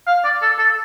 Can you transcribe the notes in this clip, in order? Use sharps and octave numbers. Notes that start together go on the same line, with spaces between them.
F5
D5
A4
A4